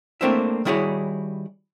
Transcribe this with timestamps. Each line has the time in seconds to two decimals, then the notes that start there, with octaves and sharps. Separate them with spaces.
0.21 A3 A#3 C4 D4 E4 E5
0.65 D#3 G3 E4 F#4 G#4 C#5